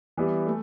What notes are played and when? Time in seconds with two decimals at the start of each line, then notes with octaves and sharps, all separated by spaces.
0.17 E3 G3 B3 E4 G4
0.46 A3